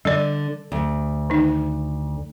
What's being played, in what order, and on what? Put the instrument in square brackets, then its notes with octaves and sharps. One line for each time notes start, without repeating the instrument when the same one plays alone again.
[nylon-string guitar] D3 [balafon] G3 D5
[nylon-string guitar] D2
[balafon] D#3 D#4